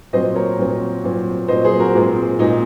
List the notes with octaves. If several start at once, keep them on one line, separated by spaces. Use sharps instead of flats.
A#2 F#3 C4 C5 D#5
A#4 C#5
A#2 F#3 C4
A#2 F#3 C4
A#2 F#3 C4 C5 D#5
G#4 C5
F#4 A#4
A#2 G#3 C4
A#2 G#3 C4 D#4